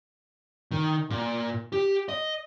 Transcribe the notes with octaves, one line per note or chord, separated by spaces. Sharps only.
D#3
A#2
G4
D#5